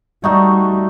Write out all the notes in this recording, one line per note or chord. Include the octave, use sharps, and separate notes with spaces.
G3 A3 D#4 F#4